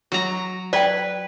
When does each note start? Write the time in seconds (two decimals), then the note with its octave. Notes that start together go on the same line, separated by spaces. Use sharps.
0.12 F#3 A#5
0.73 B4 D5 G5